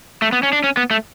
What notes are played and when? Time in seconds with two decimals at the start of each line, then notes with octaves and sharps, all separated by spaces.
0.22 A3
0.32 B3
0.43 C#4
0.53 D4
0.64 C#4
0.77 B3
0.91 A3